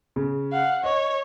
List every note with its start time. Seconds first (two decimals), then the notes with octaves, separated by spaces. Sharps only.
0.16 C#3
0.52 F5 F#5
0.84 C#5 D#5